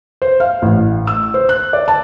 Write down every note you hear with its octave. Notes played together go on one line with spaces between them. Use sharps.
C5
F5
A1
E6
C5
F#6
D5
A5